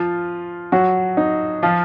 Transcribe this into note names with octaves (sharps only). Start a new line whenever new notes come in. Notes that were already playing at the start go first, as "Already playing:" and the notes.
Already playing: F3 F4
F#3 F#4
D#4
F3 F4